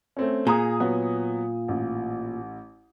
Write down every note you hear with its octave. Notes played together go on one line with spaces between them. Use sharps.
A3 C4 C#4
A#2 G#4 A#5 D#6
F#3 B3
A1